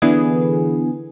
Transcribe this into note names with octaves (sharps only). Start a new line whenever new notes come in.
D3 E3 B3 G#4